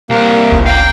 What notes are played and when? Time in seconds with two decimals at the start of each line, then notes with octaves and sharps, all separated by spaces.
0.10 C2 A#3
0.52 G1 C#2
0.66 F5 G5 A#5